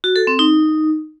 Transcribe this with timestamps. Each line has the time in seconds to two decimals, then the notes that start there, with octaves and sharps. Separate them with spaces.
0.04 F#4
0.16 A4
0.27 C4
0.39 D#4